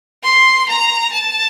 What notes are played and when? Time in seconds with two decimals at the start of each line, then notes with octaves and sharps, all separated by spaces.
0.23 C6
0.68 A#5
1.12 A5